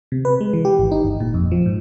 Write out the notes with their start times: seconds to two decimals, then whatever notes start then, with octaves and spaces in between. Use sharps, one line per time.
0.12 C3
0.25 B4
0.41 G#3
0.53 E3
0.65 G4
0.79 G#1
0.92 D#4
1.04 G1
1.20 A#2
1.34 F2
1.52 F3
1.66 G#2